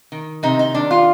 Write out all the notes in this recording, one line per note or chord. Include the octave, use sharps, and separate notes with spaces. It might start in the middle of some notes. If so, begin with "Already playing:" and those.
D#3
C3 D#4
D#4
D#3 D4
F4